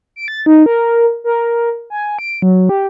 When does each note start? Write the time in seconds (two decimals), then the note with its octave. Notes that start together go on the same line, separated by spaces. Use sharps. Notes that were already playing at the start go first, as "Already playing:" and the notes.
0.16 D7
0.28 A6
0.46 D#4
0.66 A#4
1.24 A#4
1.90 G#5
2.19 D7
2.42 F#3
2.69 G4